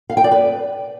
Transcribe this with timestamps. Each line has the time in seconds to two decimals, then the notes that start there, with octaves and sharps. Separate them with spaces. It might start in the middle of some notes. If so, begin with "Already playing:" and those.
0.10 F5
0.17 G5
0.24 D5
0.31 B4